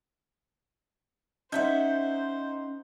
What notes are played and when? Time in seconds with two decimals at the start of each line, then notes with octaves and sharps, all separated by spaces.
1.52 C#4 D#4 C5 E5 F#5 G6